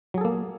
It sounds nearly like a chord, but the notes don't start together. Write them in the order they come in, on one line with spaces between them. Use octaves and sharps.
F#3 G#4 A4 A#3